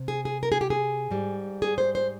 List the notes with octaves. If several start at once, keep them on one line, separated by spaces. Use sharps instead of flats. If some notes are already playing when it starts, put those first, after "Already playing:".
Already playing: C3
G#4
G#4
A#4
G#4
G4
G#4
G#2 G3
G#4
C5
C5